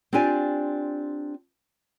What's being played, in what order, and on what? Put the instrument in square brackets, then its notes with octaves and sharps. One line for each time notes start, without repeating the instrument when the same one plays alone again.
[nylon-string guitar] C4 D4 F4 G4 D5 G#5